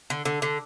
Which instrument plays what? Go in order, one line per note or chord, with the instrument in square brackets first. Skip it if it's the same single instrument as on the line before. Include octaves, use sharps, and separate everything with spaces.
[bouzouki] D3
D3
D3